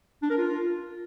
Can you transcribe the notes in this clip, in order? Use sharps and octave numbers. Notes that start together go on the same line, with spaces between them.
D4
A#4
F4